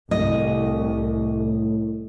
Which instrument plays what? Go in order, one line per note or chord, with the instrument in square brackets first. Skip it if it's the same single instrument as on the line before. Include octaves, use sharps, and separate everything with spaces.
[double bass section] C2 [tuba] A2 [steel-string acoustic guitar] D#5